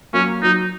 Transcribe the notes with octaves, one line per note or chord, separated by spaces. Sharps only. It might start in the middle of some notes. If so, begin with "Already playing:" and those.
F#3 A#3 C#4
F#3 D#4